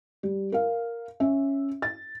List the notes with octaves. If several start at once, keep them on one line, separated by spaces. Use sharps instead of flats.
G3
A#4 F5
C#4 E5
A6